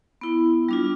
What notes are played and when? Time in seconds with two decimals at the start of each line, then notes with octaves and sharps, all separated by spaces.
0.21 B3 E4
0.69 G3 D4 F4